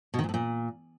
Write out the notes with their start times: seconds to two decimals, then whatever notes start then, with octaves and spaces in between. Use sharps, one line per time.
0.14 B2
0.19 D#3
0.24 A#2
0.29 A2
0.34 A#2